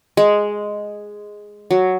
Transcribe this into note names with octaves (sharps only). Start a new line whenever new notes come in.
G#3
F#3